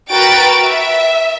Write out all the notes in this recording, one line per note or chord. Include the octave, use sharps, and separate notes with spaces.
F#4 A#4 B4 G5 A6 D7
E5